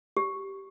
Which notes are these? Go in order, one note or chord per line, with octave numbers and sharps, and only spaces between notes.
G4